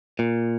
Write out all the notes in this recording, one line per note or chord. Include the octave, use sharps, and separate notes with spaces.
A#2